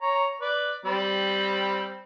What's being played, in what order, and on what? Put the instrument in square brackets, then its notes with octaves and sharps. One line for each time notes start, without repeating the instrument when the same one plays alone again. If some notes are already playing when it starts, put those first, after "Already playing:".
[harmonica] C#5 A#5
B4 D5
G3 C4 B5